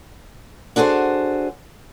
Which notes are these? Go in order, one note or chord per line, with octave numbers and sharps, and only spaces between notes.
D4 F#4 G#4 A4 C5